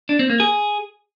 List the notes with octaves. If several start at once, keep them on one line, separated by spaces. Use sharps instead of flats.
D4
C4
A#3
G#4